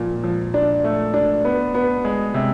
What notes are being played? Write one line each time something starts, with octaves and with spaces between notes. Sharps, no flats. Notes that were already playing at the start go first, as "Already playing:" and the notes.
Already playing: A#2 F3
F3
D4
A3
D4
B3
B3
G#3
C3